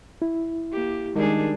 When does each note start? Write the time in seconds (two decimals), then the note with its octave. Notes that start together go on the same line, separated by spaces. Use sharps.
0.22 E4
0.72 A#3 G4
1.16 D#3 G3 G#3 D4 D#4 G#4 A#4